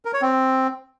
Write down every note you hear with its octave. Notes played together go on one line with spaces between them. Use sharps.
A#4
C#5
C4